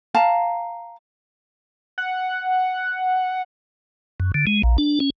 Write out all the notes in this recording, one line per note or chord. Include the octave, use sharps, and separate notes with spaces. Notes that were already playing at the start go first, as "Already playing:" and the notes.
F5 A5 A#5
F#5
F#2
D3
G#3
A#1
D4
C#4